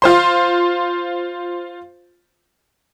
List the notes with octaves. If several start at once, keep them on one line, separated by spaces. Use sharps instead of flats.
F4 C5 C6